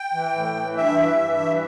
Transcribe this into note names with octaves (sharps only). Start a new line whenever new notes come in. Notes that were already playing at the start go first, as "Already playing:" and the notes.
Already playing: G5
E3
A2
E3
G2 E5
E3
G2
E3